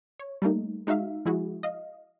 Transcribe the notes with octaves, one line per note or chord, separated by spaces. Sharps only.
C#5
G3 A3 A#3 D#4
G#3 D#4 F#4 E5 F5
F3 G#3 E4 F#4 G#4
D#5 F5